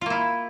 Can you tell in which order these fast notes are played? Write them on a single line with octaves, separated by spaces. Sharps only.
F4 A#3 E4